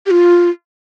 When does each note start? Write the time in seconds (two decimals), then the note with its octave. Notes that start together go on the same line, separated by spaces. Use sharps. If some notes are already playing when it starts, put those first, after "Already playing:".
0.06 G4
0.11 F4